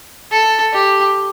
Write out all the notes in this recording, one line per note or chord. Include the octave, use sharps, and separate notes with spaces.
A4
G4